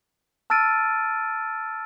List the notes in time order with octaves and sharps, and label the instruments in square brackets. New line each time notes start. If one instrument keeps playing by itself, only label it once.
[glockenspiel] A5 E6 F6 A6 D7 D#7